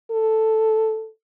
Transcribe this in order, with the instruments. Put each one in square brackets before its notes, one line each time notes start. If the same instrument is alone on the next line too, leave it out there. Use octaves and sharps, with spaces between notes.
[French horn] A4